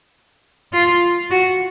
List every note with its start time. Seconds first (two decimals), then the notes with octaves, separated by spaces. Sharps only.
0.73 F4
1.30 F#4